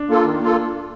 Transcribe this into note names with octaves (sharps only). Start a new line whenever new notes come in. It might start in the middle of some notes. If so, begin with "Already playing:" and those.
Already playing: D4
A#3 F4 A4
D#3
A#3 F4 A4